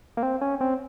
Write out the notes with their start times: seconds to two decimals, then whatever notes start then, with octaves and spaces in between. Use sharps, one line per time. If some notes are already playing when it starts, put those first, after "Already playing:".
0.17 A#3
0.23 C4
0.41 C#4
0.61 C4